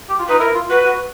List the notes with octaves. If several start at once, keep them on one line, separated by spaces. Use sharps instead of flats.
G4
F4
D#4 B4
E4 A#4
F4
F#4 B4
F#4